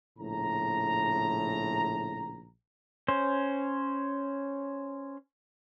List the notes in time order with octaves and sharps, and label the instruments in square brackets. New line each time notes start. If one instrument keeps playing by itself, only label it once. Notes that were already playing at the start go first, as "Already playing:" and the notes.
[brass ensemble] A#1 A2 C#3 A#5
[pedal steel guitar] C#4 C5